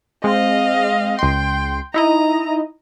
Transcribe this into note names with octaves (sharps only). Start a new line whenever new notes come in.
G#3 C4 D#5 F5
C#2 G5 C6
D#4 E4 D#5 A#5